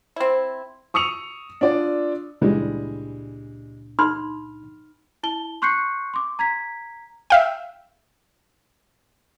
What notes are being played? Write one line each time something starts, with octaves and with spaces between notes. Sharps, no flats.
C4 E4
C#6 D#6 E6 C#7 F7
D4 F4 D5
C#2 A#2 E3 G3 G#3 D4
D#4 B5 C6 F6
E4 A5 G7
C6 C#6 F#6 G6 C7 C#7
C6 D6
A#5 G#6 B6
E5 F5 G5